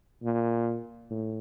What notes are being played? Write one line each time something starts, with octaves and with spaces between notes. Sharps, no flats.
A#2
A2